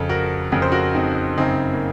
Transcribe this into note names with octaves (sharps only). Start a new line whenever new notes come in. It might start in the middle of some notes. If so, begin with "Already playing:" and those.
Already playing: F2 C#3 A4
F#4 A#4
F2 C#3 A#4
C5
F#4 A#4
C4 D#4
F#2 C#3 C4 D#4
A#3